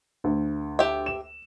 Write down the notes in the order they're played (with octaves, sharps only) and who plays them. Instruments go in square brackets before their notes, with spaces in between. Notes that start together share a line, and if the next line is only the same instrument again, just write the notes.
[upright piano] D2
[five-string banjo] G4 E5
[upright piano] E7